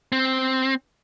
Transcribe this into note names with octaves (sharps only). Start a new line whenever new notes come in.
C4